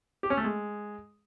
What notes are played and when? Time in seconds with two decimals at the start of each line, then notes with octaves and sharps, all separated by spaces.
0.23 G4
0.30 C#4
0.37 A3
0.44 G#3